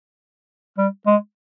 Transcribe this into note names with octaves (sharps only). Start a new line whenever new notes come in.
G3
G#3